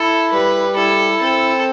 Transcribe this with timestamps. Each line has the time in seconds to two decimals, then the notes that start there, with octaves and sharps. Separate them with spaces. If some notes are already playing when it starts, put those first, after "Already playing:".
Already playing: E4 A4
0.32 G3 B4
0.76 E4 A4
1.21 C4 A4